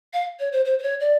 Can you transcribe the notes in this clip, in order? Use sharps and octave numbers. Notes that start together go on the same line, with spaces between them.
F5
C#5
C5
C5
C5
C#5
D5